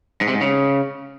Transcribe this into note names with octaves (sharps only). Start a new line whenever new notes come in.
G#2
C3
G#2
C#3